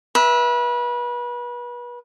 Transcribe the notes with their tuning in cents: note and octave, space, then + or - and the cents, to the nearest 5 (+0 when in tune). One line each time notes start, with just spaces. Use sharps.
B4 -30 E5 +0